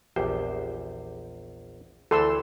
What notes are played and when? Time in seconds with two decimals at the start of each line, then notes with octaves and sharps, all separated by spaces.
0.16 A#1 E2 G4 C5
2.11 D2 E3 A4 C6 E6